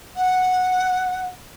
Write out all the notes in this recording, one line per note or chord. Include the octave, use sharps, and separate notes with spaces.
F#5